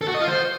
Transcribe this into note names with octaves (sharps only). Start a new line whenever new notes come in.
A4
F#4
D#5
F4
C5